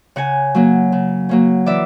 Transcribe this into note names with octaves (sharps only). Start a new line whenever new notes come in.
C#3 F#5 G#5
F#3 A#3 C#4
C#3
F#3 A#3 C#4
E3 D5 E5